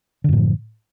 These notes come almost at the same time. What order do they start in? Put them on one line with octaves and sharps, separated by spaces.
D3 F#2 A2 F3